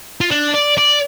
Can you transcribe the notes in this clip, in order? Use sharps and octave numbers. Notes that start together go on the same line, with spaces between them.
F4
D4
D5
D5